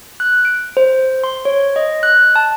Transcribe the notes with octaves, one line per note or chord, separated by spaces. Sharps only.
F#6
D7
C5
C6
C#5
D#5
F#6
A5